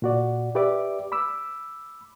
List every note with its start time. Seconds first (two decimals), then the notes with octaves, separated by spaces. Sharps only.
0.02 A#2 F#4 D5
0.55 G4 B4 D5 E5 D6
1.12 B5 D6 E6